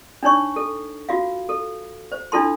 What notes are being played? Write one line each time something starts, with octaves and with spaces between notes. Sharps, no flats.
D4 D#4 C#5 C#6
A4
F4 F#4 F5
A4
C5
D4 E4 F4 A4 A5 C6